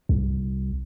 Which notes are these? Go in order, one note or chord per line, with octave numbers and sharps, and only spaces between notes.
C2